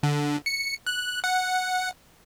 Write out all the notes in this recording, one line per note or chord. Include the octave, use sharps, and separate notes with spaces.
D3
C#7
F#6
F#5